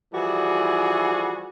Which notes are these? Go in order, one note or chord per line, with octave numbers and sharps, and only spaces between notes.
E3 F3 G3 F#4 G#4